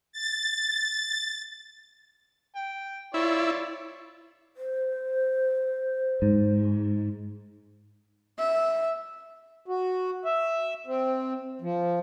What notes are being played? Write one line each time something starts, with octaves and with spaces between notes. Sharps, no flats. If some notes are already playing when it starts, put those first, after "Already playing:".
A6
G5
E4 F4 C#5 D5
C5
G#2
E5
F#4
E5
C4
F3